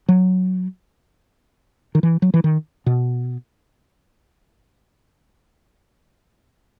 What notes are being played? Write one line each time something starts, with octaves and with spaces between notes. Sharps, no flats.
F#3
D#3
E3
F#3
E3
D#3
B2